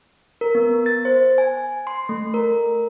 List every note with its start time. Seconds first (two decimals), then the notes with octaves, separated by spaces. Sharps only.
0.41 A#4
0.55 B3
0.86 A6
1.05 C5
1.38 G#5
1.87 C6
2.09 A3
2.34 A#4